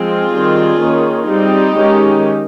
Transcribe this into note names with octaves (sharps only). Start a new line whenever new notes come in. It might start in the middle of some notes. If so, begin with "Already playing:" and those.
Already playing: F3 G#3 C4 F4 G#4
D#3 G3 C4
D#3 A#3 C#4
G3 C4 D#4 G4
D#3 G#3 C#4